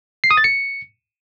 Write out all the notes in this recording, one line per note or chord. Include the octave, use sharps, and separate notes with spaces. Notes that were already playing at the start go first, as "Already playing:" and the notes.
C7
D#6
A6
C#7